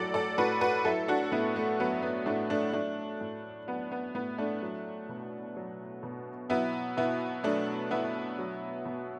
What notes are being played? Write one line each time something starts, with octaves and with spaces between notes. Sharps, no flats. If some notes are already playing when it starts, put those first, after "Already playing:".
Already playing: A2 F#3 F#4 A4 D5
A4 D5
A2 F#4 B4
F#4 B4
F#3 E4 A4
D4 F#4
A2 B3 E4
A3
F#3 B3
B3
A2 A3 D4
A3 D4
F#3 A3 D4
A2
F#3 B3
B3
A2 B3
A3 D4
F#3
B2
F#3
B2
F#3 B3 E4
B2 B3 E4
F#3 A3 D4
B2 B3 E4
F#3
B2